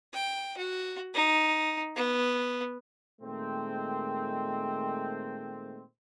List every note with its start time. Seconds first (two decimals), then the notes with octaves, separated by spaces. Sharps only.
0.14 G5
0.57 F#4
1.14 D#4
1.96 B3
3.21 A#2 D#3 G#3 A3 C4